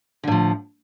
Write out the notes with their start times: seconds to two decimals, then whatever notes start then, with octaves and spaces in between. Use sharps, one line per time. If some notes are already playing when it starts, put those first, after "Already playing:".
0.23 D3
0.27 A2
0.31 F3